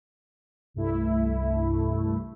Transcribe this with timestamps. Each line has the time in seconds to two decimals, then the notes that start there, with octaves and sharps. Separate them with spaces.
0.74 C2 G2 A3 E4